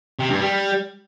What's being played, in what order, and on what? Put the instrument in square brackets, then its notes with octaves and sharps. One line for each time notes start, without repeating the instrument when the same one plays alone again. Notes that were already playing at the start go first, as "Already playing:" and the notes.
[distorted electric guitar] C3
G2
G3